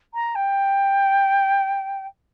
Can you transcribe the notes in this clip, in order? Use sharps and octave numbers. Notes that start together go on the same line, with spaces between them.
A#5
G5